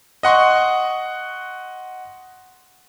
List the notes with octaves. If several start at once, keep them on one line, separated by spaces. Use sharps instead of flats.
D#5 F#5 C6 C#6